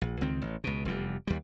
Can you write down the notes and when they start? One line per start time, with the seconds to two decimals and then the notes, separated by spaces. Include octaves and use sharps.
0.01 A#1
0.21 C#2 D#3 C4
0.42 A1
0.64 C#2 B2
0.85 F1 E2 G3
1.27 D#2 G3